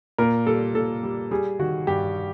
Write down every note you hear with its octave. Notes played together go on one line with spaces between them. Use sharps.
A#2 A#4
G3 A4
A#2 A4
G3
G3 G#4
D#3 F#4
G2 G4